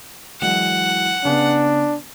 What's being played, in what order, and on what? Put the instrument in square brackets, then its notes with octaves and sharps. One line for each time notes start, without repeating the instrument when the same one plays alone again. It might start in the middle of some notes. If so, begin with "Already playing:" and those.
[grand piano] E3 F#3 G#3 [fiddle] F#5
[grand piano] C#3 B3 [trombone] D4